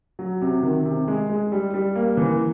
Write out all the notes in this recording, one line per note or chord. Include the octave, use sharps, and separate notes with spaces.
F#3
C3
D#3
C3
G#3
G#3
G3
G3
A#3
E3